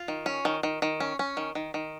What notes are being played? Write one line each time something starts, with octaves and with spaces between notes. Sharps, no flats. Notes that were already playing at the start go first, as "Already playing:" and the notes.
Already playing: F4
D#3
C#4
D#3
D#3
D#3
C#4
C#4
D#3
D#3
D#3